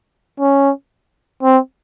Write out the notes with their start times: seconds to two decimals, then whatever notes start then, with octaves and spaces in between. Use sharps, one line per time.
0.40 C#4
1.43 C4